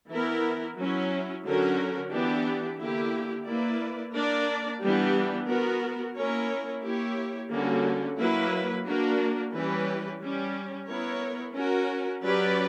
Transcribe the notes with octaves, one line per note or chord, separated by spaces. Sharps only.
E3 B3 E4 A#4
F#3 C#4 E4
D3 F#3 C#4 F#4 A#4
E3 B3 D4 G4
D3 A#3 E4 G4
A#3 E4 B4 D5
A#3 D4 A#4 D5
E3 G3 B3 D4 G4
B3 F#4 A#4
A#3 C#4 E4 A#4 C#5
A#3 E4 G4 C#5
D3 G3 A#3 C#4 F#4
F#3 A#3 E4 B4
A#3 D4 F#4 A#4
E3 G3 C#4 G4 B4
G3 C#4 G4
B3 E4 A#4 C#5
C#4 F#4 A#4
F#3 C#4 G4 B4 D5